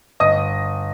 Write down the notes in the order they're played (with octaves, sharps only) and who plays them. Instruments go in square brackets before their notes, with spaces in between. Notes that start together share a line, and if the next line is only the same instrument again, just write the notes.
[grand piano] G1 D#5 D#6